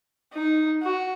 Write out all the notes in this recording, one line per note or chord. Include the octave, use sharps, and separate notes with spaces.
D#4
F#4